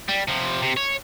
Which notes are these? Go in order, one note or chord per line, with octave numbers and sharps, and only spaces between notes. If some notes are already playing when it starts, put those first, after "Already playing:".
G3
C3 F3
C3
C#5